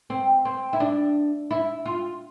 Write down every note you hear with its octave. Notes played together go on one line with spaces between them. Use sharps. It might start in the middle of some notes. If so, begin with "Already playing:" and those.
C4
C4
E4
D4
E4
F4